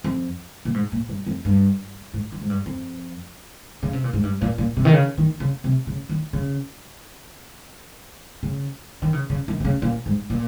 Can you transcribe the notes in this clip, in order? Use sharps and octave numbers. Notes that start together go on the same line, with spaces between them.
F2
A#2
G#2
A#2
G2
F2
G2
G#2
D#3
G#2
G2
F2
C#3
C3
A#2
G#2
G2
A#2
A#2
C3
D#3
C#3
D#3
C#3
C3
C#3
D#3
C#3
C#3
D#3
C#3
C#3
D#3
C3
C#3
A#2
G#2
A#2